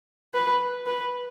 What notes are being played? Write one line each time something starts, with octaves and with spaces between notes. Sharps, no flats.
B4
B4